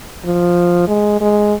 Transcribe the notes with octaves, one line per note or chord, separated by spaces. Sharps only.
F3
G#3
G#3